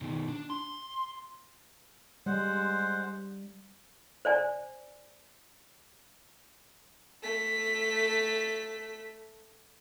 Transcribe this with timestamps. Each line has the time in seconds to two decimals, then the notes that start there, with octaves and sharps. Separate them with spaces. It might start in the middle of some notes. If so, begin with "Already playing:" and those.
0.01 B2 D#3
0.28 D4
0.50 C6
2.26 G3 G#3 C5 F#5
4.25 C5 D5 G#5
7.22 A3 B6